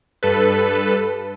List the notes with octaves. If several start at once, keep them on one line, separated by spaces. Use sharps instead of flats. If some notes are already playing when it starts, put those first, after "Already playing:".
G2 A4 B4